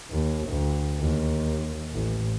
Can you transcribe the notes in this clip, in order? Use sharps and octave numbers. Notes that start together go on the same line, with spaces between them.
D#2
D2
D#2
A1 A2